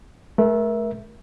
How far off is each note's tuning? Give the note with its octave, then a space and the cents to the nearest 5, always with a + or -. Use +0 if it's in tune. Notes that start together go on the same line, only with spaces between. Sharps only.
A3 -35 A#4 +30 E5 +0